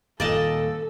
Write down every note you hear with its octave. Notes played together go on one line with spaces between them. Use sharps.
D#1 D#2 A#2 A4 D5 D#5 A5